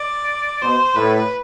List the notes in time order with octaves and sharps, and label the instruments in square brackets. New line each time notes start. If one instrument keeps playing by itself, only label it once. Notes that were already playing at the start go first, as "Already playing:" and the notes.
Already playing: [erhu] D5
[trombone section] B2 [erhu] C5
[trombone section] A2 [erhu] B4